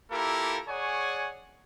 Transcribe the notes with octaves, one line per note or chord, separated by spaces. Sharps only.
A#3 E4 F4 G4 A4 A#4
G#4 C#5 D5 F#5 G#5 C#6